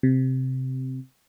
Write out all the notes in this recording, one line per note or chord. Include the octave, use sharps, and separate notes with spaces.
C3